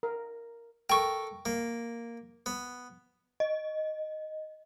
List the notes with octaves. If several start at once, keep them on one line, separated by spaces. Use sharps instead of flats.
A#4
A4 A#4 G5 C#6
A#3
B3
D#5